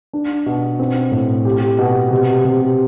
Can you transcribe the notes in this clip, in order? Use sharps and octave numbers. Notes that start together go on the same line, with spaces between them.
D4
B2
C4
A2
G4
B2
C3
C3